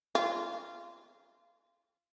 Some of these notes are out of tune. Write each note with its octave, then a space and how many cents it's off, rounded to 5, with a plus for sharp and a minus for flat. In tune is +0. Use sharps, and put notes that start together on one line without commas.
F4 -25